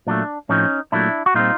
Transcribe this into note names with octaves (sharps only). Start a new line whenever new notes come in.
A#2 F#3 A3 D4
A2 F3 A3 C4 C#4 D#4
A#2 F#3 A3 D4 E4
F#4
A#2 G3 C4 D#4 F4